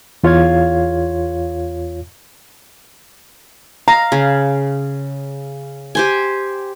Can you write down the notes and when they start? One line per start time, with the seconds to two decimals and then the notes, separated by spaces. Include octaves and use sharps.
0.23 E2 F4 C#5 F5 G#6
3.88 F5 A#5
4.12 C#3
5.95 G4 C5 G#5